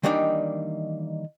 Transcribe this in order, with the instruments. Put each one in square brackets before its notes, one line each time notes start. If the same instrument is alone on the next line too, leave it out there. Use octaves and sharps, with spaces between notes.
[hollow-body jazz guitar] D#3 E3 G3 A#3 D4 D#4